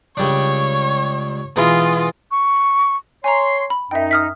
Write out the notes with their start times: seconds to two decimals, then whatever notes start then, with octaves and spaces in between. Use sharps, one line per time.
0.17 C#2 G3 D4 C#5
1.56 B2 E3 G#3 F4
2.31 C#6
3.24 C#5 G#5 A#5 C6
3.70 B5
3.91 F#2 D#4 E5 G5
4.11 D#6 F6 B6